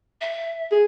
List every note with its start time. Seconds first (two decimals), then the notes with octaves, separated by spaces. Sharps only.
0.21 E5
0.72 G#4